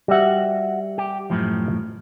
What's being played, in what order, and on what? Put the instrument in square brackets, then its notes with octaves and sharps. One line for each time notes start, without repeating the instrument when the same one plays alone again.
[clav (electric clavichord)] G3 E5 [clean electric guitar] F#4 F#5
[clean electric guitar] G4
F#2 A2 F3